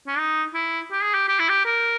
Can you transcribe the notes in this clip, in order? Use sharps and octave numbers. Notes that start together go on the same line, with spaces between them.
C#4
D#4
E4
G4
G#4
G4
G4
E4
G4
A#4